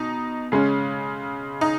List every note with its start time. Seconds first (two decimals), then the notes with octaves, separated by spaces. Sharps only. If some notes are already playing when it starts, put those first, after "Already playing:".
Already playing: B2 D#4
0.52 C#3 G#3 C#4
1.61 D#4